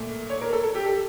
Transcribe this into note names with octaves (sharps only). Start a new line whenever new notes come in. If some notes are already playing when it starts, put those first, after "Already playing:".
Already playing: A#2 A3
C#5
A#4
A4
A4
G4
A4